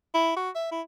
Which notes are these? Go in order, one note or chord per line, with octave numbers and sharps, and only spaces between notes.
E4
F#4
E5
E4